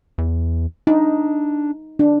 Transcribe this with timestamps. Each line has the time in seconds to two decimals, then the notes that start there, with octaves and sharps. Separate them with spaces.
0.18 E2
0.87 D4 D#4
1.99 D4